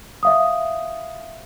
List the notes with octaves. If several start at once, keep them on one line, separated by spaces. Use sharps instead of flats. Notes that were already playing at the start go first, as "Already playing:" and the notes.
E5 F5 D#6